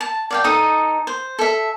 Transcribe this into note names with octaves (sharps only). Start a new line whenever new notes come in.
A5
D5 F5 G5
D#4 A4 D#6
C5
A4 E5